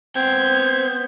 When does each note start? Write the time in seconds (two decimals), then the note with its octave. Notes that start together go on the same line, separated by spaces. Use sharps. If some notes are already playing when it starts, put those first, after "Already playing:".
0.16 B3 C4 G5 G6 G#6